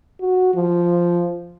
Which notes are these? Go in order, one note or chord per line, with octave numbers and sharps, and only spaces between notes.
F#4
F3